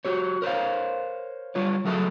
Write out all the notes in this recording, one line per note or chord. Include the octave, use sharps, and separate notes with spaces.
F#4 G4 C#5
A#4 C5 C#5 F5
G3 F4 C#5
F#3 A3 F#4 G#4 A4 E5